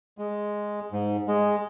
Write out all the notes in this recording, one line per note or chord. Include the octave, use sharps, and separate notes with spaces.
G#3
G#2
G#3